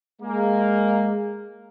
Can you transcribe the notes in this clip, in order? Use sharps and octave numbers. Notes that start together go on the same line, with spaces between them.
G#3 A#3